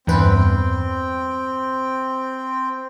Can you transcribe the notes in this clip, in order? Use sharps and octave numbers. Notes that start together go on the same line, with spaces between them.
E2 G2 C4 B4 G5